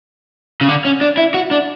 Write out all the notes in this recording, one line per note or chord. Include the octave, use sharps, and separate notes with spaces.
C#3
D3
C#4
D4
E4
F#4
D4